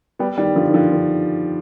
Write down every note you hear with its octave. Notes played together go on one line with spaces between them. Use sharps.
G3 B3
D#3 G3
D3 F3
D#3
D3 F3
D3